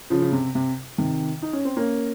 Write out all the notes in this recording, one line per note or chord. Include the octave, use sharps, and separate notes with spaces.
C#3 F3
C#3
C3
C3
C3 D#3
D#4
C#4
C4
A#3 C#4